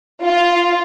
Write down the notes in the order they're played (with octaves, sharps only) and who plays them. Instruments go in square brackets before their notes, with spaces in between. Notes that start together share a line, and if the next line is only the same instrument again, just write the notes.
[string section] F4